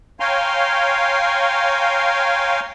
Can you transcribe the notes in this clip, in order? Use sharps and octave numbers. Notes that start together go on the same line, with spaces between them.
C#5 F5 G5 G#5 A#5 C6